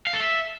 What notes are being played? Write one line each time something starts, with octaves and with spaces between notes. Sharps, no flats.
F5
A4
E5